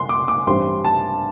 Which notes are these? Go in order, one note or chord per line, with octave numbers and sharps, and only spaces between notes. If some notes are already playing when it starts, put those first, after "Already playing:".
Already playing: C6
D6
D6
A1 G2 G3 C4 C6
A5